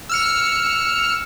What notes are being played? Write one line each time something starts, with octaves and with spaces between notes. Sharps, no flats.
E6 F6 C#7